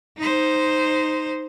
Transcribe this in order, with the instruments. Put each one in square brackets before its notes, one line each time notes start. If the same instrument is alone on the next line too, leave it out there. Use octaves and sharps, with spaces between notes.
[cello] D#4 C5